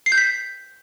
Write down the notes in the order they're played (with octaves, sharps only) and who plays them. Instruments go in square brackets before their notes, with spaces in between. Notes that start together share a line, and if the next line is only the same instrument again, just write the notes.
[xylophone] C7
G6
B6